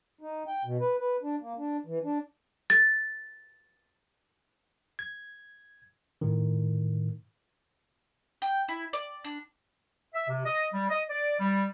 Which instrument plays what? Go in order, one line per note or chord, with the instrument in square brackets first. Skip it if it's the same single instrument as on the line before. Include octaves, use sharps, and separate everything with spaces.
[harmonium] D#4
G5
B2
B4
B4
D4
A#3
D4
E3
D4
[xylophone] A6
[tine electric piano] G#6
A2 D#3
[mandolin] G5
E4
D5
D4
[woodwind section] E5
C3
D#5
G3
D#5
D5
G3